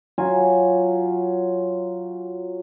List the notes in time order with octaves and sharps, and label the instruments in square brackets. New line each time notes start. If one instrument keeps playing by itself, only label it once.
[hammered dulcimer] F#3 F4 G#5